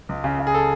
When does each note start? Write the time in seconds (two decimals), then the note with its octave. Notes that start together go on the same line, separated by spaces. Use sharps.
0.09 C#2
0.24 C#3
0.39 C#3
0.47 G#4
0.54 A4